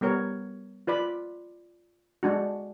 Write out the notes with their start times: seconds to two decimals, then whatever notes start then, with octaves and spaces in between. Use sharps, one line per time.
0.01 G3 B3 A#4 C#5
0.87 F4 B4 D5 B5
2.23 G#3 D4 F#4